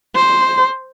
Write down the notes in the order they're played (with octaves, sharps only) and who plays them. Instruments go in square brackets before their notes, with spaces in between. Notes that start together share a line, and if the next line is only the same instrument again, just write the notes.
[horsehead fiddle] C5